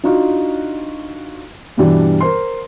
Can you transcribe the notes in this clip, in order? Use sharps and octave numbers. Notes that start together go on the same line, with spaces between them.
D4 D#4 F4 F#4
G2 B2 E3 G3 D4
A#4 C5 C6